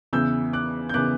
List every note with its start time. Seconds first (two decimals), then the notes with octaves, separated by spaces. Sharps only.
0.13 E2 C#3 E3 B3 E6 G6
0.53 D6 F#6
0.89 G6
0.94 C#3 E3 B3 D6 F#6